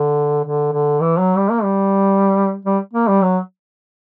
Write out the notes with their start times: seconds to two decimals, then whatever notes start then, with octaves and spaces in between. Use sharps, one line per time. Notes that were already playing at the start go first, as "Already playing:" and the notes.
Already playing: D3
0.44 D3
0.72 D3
1.01 E3
1.19 F#3
1.37 G3
1.50 A#3
1.63 G3
2.65 G3
2.93 A#3
3.07 G3
3.21 F#3